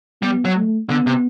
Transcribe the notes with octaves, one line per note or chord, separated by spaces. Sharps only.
G3 B3
F#3
A3
D3 B3
C3